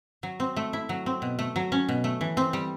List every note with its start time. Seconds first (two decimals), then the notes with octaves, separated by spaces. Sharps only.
0.23 F#3
0.40 C4
0.56 A3
0.73 E4
0.89 F#3
1.06 C4
1.22 B2
1.39 A3
1.56 F#3
1.72 C#4
1.89 B2
2.04 A3
2.21 E3
2.37 C4
2.53 G3